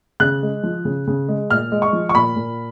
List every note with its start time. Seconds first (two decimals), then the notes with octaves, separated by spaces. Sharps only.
0.20 C#3 F#6
0.43 G#3
0.63 F3
0.85 C#3
1.07 C#3
1.28 G#3
1.50 A#2 F6
1.72 G#3
1.82 C#6
1.93 F3
2.09 C#6
2.15 A#2 B5
2.36 A#2